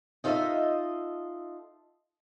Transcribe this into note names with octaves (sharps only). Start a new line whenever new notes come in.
D#4 F4 A4 C#5 D#5 E5